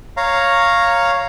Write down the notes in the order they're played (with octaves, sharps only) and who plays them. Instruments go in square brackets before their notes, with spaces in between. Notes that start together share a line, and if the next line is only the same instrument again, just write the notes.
[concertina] C#5 F5 A#5